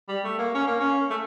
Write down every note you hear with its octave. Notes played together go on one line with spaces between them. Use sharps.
G3
A3
A#3
C#4
A#3
C#4
A3